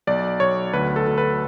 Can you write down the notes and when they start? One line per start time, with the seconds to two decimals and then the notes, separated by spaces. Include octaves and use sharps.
0.07 B1 D5
0.40 B1 C#5
0.73 D2 B4
0.96 A4
1.07 D2
1.18 B4